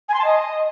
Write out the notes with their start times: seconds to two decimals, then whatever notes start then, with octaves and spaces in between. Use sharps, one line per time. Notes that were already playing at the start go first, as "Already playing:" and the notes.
0.08 G#5
0.13 C6
0.18 A5
0.24 D#5